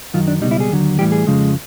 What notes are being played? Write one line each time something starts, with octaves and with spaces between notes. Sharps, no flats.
F#2 D#3 F#3 F4
D4
C#2 B2 G3 D#4
E4
G#4
D#2 D3 F#3
A2 E3 G3 G4
G#4
F2 C#3 F3 G#3